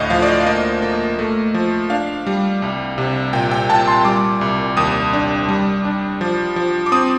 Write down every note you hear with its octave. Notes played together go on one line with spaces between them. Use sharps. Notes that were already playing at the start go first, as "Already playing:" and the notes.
Already playing: D2 A2 D#5 F5
F3 F5
D5
D#5
F5
A#3 D#5
A#3
A3
F3
D4 F5
G3
C2
C3
A#2 G5
G5
A#2 A5
C6
G3 D6
C2
D#2 D#6
D4
G3
D4
F3
F3
D6
C4 D#6